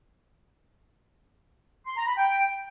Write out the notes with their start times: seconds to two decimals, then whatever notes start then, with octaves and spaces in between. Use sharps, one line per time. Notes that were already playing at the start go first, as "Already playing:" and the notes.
1.86 C6
1.97 A#5
2.07 B5
2.17 G5